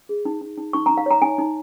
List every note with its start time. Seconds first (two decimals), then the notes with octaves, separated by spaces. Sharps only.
0.09 G#4
0.25 D#4
0.41 D#4
0.58 D#4
0.73 D#4 C#6
0.86 D#4 A#5
0.97 F5
1.06 C#5 A#5
1.22 D#4 G#5
1.38 D#4